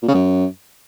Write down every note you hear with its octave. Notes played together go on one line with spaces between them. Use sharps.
A#2
C#3
F#2